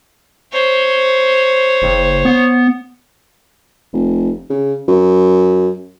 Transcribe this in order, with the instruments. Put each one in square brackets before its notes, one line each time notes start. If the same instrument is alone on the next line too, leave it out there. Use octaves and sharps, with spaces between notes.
[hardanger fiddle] C5 C#5
[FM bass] F#1
B3
[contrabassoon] F1
C#3
F#2